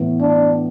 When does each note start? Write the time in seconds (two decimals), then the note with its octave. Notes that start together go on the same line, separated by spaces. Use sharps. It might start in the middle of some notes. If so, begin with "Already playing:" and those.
Already playing: A2 E3 B3
0.21 D4